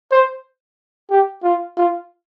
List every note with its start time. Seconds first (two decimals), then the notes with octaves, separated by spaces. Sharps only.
0.12 C5
1.10 G4
1.44 F4
1.77 F4